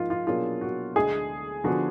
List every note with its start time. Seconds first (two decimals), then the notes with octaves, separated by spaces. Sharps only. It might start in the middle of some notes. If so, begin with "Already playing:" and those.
Already playing: G#2 F3 A#3 F4
0.10 F4
0.27 B2 F#3 A#3 D4 F4 G#4
0.61 F#4
0.96 D2 D3 G#3 D4 G#4
1.64 D3 F3 B3 D4 F#4